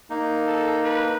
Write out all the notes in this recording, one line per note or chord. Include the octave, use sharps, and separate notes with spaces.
A#3 D#4
A4
B4